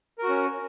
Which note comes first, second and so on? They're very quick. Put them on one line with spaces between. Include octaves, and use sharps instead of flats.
A#4 F#4 C#4